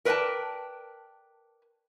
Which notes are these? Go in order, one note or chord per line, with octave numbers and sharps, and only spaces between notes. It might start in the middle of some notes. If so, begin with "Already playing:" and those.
A#4 B4 D5 F5 G5 A5